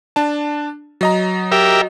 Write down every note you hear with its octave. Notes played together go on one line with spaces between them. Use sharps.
D4 A5
F#3 D#5 A#5
G4 A#4 E5